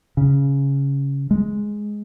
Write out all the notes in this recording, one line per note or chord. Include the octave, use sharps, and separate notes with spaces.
C#3
G#3